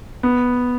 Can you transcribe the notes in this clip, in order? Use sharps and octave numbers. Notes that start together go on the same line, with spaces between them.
B3